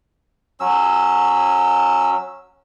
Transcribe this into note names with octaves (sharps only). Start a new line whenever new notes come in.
F#3 C#4 E6